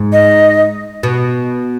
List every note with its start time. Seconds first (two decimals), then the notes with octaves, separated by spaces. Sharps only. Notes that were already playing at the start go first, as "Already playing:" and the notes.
Already playing: G#2
0.13 D#5
1.03 B2